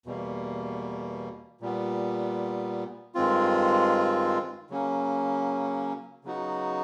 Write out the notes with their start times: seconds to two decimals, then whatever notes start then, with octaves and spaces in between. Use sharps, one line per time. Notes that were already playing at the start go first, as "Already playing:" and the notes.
0.06 E2 B2 G3 A#3
1.61 A#2 G3 B3
3.15 G2 D#3 G#3 C4 F4
4.70 C#3 F#3 A#3 C#4
6.24 C#3 F#3 B3 D#4 F#4